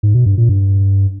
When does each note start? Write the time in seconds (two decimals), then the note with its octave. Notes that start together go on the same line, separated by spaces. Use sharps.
0.03 G#2
0.15 B2
0.26 G2
0.38 A#2
0.49 G2